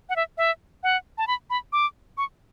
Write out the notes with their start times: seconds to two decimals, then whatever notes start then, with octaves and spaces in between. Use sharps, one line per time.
0.09 F#5
0.16 E5
0.38 E5
0.83 F#5
1.18 A5
1.27 B5
1.50 B5
1.73 D6
2.18 C#6